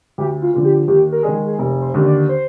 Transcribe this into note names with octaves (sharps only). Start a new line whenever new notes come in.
D2 G4
F4
D3 F3
G4
D#2 G4
A#4
D#3 G#3 G#4
G#4
F1 A#4
C5
D#2 D3
D5
C5